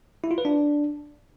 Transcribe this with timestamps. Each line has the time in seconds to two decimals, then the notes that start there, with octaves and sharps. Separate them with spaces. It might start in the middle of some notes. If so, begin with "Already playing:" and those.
0.24 E4
0.31 F4
0.38 B4
0.45 D4